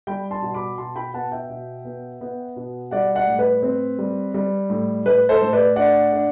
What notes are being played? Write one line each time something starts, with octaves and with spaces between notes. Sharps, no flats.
G3 G5 B5
A5 C6
B2
B5 D6
B2 A5 C6
G5 B5
B3 F#5 A5
E5 G5
B2
B3
B3
B2
G3 D5 F#5
D5 F#5
A2
B4
C4
G3
G3
A2
A2 B4
A4 C5
A2
B4 D5
D4 D5 F#5
D4